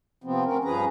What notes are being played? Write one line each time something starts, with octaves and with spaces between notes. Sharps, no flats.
C3 F3 B3 C4
D2 C4 C#4 A#4
G2 F3 C#4 G#4 B4 A#5